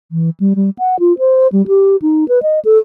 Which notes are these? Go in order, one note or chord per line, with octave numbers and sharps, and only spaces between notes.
E3
G3
G3
F#5
F4
C5
G3
G4
D#4
B4
D#5
A4